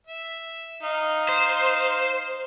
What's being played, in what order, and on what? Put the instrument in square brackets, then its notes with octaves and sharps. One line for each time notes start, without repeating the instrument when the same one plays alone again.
[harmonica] E5
D#4 F5
[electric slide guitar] C5